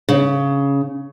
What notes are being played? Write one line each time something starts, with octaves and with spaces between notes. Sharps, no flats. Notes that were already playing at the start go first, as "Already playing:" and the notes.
C#3